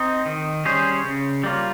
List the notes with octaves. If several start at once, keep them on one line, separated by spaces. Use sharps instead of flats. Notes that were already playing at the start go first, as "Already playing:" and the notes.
Already playing: C4 D#4
D#3
G3 C#4 G#4 C5
C#3
G3 A#3 F4